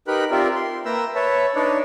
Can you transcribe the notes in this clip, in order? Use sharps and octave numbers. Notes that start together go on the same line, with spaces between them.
D#4 G4 A#4 B4 B5 F#6
C4 F4 G4 A#4 D5 E5
C6
A#3 B4 E5 G5 A#5 E6
B4 C#5 E5 A5
D4 D#4 B4 C#5 D5